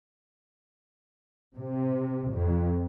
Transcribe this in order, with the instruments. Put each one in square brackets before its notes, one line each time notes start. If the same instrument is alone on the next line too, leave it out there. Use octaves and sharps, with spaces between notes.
[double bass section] C3
F2